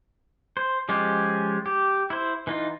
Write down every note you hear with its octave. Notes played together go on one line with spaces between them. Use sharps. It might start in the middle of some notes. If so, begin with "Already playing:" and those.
C5
F3 G#3 C#4 F4 G4
G4
E4 C5
E3 D#4 F4